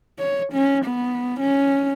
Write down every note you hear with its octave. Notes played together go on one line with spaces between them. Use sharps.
C#5
C#4
B3
C#4